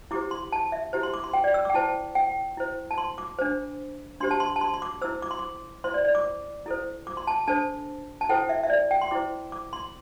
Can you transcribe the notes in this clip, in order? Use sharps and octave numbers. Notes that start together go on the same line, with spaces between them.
E4 G4 C5 D6
C6
A5
E5
E4 G4 C5
C6
D6
C6
G5
D5
E6
D6
G5
E4 C5 A5
G5
E4 C5
A5
C6
D6
D4 C5
D4 G4 C5 C6
A5
C6
A5
C6
C6
D6
E4 C5 E6
D6
C6
D6
E4 C5 C6
D5
D5
D6
E4 A4 C5
D6
C6
A5
D4 A4 C5 A5
A5
E4 A4 C5 G5
E5
E5
D5
G5
C6
E4 C5 D6
D6
C6